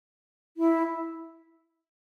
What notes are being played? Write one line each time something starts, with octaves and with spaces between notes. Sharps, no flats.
E4